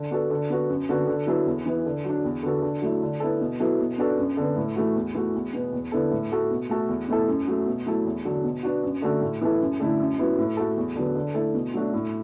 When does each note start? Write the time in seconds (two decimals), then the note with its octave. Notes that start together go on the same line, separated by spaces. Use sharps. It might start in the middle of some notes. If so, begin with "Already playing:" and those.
Already playing: D3
0.11 B3 D4 F#4 A4
0.30 D3
0.50 B3 F#4
0.69 F#2
0.89 D3 B3 F#4
1.07 D3
1.27 F#3 B3 E4 A4
1.46 E2
1.66 E3 B3 E4
1.85 D3
2.04 F#3 D4
2.24 E2
2.43 D3 B3 F#4 A4
2.62 D3
2.82 F#3 A3 E4
3.02 D3
3.20 B3 E4 A4
3.41 B2
3.60 F#3 B3 E4 A4
3.79 B2
3.98 B3 D4 F#4 A4
4.18 F#2
4.37 D3 B3
4.56 A2
4.76 E3 A3 F#4
4.95 E2
5.14 E3 A3 F#4
5.35 E2
5.53 B2 B3
5.73 E2
5.92 D3 B3 E4 A4
6.11 A2
6.32 A3 F#4 A4
6.50 B2
6.69 A3 F#4 A4
6.88 E2
7.08 B2 A3 E4 A4
7.28 F#2
7.47 F#3 A3
7.66 B2
7.86 F#3 A3 E4 A4
8.05 E2
8.25 D3 F#3
8.44 B2
8.63 B3 D4 F#4
8.83 F#2
9.02 D3 A3 F#4 A4
9.21 A2
9.41 E3 B3 E4 A4
9.61 F#2
9.80 D3 A3 E4
9.99 F#2
10.18 F#3 B3 E4
10.38 A2
10.57 A3 F#4 A4
10.77 E2
10.95 D3 F#3 B3
11.15 D3
11.34 A3 E4 A4
11.54 B2
11.74 F#3 A3 D4 F#4
11.93 A2